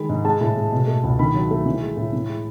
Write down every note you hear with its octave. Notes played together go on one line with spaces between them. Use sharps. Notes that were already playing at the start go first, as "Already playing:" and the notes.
Already playing: D#3 G#3 B5
G#2
G#3 A5
A2
G#3
B2
A3
C#2
D#3 B5
F#3
A3
E3
G#3
A2
E3
G#3